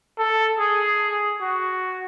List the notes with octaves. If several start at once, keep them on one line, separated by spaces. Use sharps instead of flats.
A4
G#4
F#4